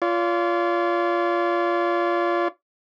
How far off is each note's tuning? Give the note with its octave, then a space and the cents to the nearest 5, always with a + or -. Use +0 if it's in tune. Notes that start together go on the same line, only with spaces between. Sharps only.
F4 -10 D5 -45